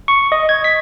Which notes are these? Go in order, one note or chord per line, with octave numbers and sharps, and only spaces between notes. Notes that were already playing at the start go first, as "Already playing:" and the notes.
C#6
D#5
G#6
B6